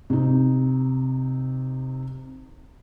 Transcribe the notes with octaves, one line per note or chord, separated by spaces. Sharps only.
C3 D#4